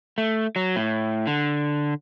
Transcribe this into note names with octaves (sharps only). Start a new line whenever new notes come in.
A3
F#3
A2
D3